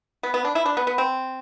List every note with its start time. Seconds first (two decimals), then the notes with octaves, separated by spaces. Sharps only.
0.23 B3
0.34 B3
0.45 D4
0.55 E4
0.66 D4
0.77 B3
0.87 B3
0.98 C4